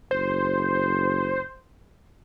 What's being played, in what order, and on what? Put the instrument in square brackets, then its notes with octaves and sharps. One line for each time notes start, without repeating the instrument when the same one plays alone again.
[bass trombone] F#1 [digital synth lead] C5